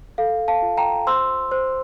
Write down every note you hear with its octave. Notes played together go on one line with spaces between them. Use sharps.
A4 F5
F5 A5
F4
G5 A#5
C5 C6 E6
C5